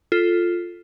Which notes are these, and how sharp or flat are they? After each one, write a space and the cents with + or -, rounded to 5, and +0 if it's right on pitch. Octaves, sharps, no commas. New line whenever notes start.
F4 +0 A4 +0